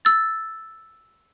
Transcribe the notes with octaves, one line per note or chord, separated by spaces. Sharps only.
E6 A6